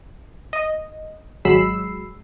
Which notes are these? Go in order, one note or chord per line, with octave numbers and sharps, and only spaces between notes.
D#5
G#1 F#3 G#3 B5 E6 C7